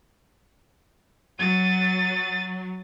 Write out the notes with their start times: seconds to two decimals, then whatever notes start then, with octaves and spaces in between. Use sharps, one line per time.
1.39 F#3 A6 D#7